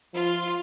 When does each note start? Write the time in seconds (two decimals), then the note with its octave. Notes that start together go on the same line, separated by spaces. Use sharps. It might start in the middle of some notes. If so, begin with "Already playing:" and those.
0.13 F3 F4